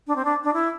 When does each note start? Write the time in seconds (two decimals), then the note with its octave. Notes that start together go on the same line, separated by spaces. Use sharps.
0.07 D4
0.16 C4
0.25 D4
0.44 D4
0.53 E4